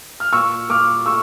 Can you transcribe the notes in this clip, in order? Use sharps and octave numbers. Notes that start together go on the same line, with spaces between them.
F6
A#2 C#6 E6
A#2 D6 F6
A3 C#6 E6